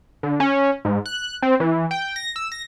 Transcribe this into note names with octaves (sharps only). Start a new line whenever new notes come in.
D3
C#4
G#2
F#6
C4
E3
G5
A#6
E6
A#6